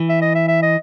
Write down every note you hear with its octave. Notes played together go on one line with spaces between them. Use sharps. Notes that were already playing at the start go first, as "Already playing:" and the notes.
Already playing: E3
E5
D#5
E5
E5
D#5